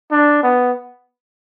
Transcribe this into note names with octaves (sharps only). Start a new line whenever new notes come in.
D4
B3